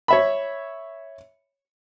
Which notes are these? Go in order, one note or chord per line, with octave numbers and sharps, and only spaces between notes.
C#5 E5 B5